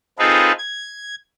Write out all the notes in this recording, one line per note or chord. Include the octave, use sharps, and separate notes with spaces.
C4 D#4 F4 G#4 A4 B4
G#6